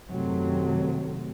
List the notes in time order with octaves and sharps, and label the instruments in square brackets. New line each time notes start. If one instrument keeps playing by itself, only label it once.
[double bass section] F#2 C3 D#3 F#3 A3 C4